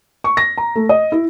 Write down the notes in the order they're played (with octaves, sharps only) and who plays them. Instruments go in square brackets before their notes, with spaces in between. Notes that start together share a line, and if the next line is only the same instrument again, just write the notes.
[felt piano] C#6
A#6
A#5
A3
D#5
E4